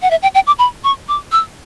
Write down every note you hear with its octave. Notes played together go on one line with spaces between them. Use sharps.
F#5
E5
G5
G5
D6
B5
C#6
D6
E6